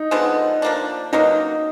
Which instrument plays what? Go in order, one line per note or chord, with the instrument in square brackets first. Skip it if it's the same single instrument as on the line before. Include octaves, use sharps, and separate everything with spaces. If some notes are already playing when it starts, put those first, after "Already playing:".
Already playing: [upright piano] D#4
[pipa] D3 F3 G#3 B3
F3 A#3 D4
[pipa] B2 F#3 A#3 [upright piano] D#4